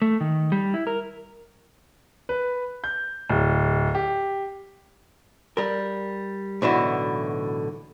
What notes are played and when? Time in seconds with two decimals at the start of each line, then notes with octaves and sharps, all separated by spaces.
0.02 A3
0.21 D#3
0.52 G3
0.74 E4
0.87 A#4
2.29 B4
2.84 G6
3.29 D1
3.95 G4
5.57 G3 A#4
6.62 B1 A2 D3 E3 E4 F#4